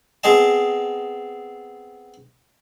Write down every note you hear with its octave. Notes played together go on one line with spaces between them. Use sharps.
B3 C4 G#4 D#5 A5